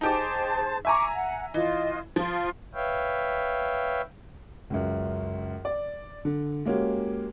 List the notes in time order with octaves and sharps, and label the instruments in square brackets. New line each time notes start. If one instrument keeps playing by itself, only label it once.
[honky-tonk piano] D#4 G4 D6 [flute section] G#4 C5 A5
[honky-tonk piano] E5 G#5 A#5 [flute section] C#6 D6
[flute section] F#5
[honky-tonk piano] E3 [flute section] F4 D#5
[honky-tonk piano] F3 [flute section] F4
[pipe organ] B4 C#5 E5 F5 G5
[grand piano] C#2 F#2
D5
D3
G#3 A#3 C#4 F#4 G4